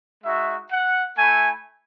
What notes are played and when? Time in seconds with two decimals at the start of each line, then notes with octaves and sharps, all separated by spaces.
0.24 G#3 D#4 F#4 E5
0.71 F#5
1.18 A3 E4 G#5